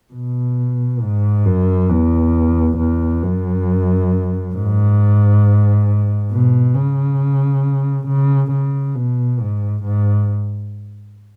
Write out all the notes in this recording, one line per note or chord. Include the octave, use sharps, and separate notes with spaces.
B2
G#2
F#2
E2
E2
F#2
G#2
B2
C#3
C#3
C#3
B2
G#2
G#2